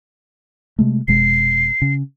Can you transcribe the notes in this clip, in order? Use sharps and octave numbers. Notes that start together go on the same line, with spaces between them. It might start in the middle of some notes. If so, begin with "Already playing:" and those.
C3 G#3 A3
F1 B2 G#3 C7
C#3